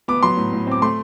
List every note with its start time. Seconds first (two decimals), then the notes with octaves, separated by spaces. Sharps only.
0.08 B3 D6
0.23 F#3 C6
0.37 A2
0.53 A2
0.67 C4 D6
0.82 A3 C6